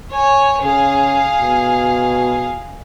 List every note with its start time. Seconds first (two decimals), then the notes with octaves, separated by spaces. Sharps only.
0.10 C#5 G#5
0.62 C#3 G#4 F5
1.40 B2